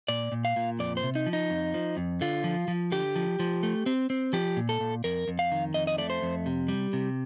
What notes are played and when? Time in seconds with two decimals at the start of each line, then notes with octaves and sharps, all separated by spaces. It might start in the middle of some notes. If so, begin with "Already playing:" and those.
0.08 A#2 D5
0.32 A#2
0.45 F5
0.56 A#2
0.79 F2 D5
0.97 C5
1.03 C3
1.15 D#4
1.26 F3
1.33 D#4
1.50 F2
1.74 F3
1.97 F2
2.21 D3 F4
2.44 F3
2.68 F3
2.92 D3 G4
3.16 F3
3.39 F3
3.63 A3
3.86 C4
4.10 C4
4.33 F3 G4
4.57 A#2
4.69 A4
4.80 A#2
5.04 F2 A#4
5.28 F2
5.39 F5
5.52 D#3
5.74 F2 D#5
5.87 D#5
5.98 A3 D5
6.10 C5
6.22 F2
6.46 C3
6.68 G3
6.93 C3